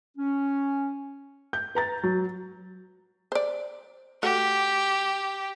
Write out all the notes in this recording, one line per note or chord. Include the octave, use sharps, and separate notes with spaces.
C#4
G6
B4 A#5 A6
F#3
C5 D5
A3 F#4 G4 F#5